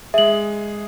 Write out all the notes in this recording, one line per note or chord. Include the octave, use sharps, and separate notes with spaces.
G#3 G#4 E5 F#7